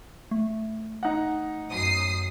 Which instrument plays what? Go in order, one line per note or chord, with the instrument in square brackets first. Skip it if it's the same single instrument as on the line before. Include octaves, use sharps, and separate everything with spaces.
[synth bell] A3
[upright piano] D#4 F#5
[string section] F#2 D#6 C7